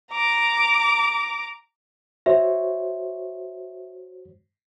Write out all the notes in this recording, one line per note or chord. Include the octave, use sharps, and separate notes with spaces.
A#5 D6
F#4 C5 C#5 E5